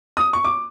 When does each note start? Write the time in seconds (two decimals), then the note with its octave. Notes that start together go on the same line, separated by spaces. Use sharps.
0.17 D#6
0.33 C#6
0.44 D6